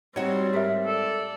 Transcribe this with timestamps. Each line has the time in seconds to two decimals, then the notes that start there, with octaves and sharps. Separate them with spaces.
0.16 G3 C4 D#4 F#4 C#5
0.53 G#2 G4 A#4 E5
0.86 A4 D5